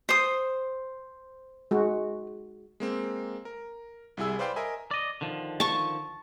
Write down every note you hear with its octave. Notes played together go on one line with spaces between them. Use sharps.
C5 D#6
G#3 F#4
G#3 A#3 C4
A#4
C2 G3 E4 G#4 E6
B4 C5 D5 F5 G5 C6
A#4 D#5 E5 G#5
D5 D#5
D3 D#3 F3
A5 C#6